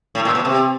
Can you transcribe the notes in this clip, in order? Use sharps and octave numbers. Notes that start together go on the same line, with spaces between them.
A2
A#2
B2
C3